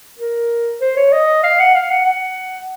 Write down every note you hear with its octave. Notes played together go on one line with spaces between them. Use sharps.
A#4
C5
C#5
D#5
F5
F#5
F5
F#5
F#5